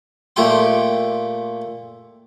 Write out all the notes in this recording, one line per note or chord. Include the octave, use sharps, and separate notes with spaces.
A#2 A3 G4 G5 C6